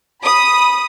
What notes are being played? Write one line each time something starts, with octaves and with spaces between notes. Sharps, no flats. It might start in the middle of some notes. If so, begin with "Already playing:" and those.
B5 D#6